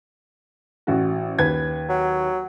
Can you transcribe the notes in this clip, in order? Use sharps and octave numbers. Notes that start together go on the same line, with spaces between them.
A1 F#4
D#2 B4 G#6
F#3